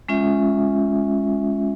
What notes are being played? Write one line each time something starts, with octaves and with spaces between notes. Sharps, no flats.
G#3 C#4 F4 E5